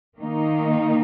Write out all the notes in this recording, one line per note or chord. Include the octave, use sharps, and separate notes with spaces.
D#3 A#3 D#4